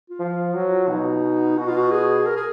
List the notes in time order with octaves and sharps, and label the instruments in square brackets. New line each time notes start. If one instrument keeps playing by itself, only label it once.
[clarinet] F4
[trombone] F3
F#3
[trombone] B2 [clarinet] D#4
[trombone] B2 [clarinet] F#4
[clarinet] F4
F#4
G#4
A#4
G#4